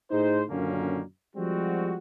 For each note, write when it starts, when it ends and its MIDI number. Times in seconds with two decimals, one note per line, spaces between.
0.10 0.43 45
0.10 0.43 63
0.10 0.43 68
0.10 0.43 72
0.49 1.02 42
0.49 1.02 46
0.49 1.02 50
0.49 1.02 51
0.49 1.02 58
0.49 1.02 61
1.36 1.98 53
1.36 1.98 55
1.36 1.98 56
1.36 1.98 60
1.36 1.98 66